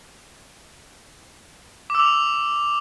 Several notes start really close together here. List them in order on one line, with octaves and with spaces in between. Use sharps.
D6 E6 F7